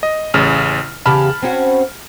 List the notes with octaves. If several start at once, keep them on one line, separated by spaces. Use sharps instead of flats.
D#5
A1 C#3 F6
E2 C#3 G4 A5 B5 F6
C4 C#4 F#4